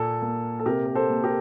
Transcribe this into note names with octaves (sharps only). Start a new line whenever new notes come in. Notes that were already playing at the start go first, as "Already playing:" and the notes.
Already playing: A#2 A#3 A4
A#3
A4
C3 G4 A#4
A#4
A4 C5
A#3
G4 A#4